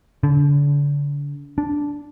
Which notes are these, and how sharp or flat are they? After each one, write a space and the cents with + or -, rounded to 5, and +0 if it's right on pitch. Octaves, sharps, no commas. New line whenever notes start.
D3 -35
D4 -10